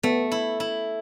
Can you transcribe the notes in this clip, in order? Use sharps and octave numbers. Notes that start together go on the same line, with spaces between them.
A3 B3
E4
E4